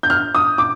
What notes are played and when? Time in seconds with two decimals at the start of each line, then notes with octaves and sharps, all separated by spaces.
0.03 G6
0.10 F6
0.35 D#6
0.58 D6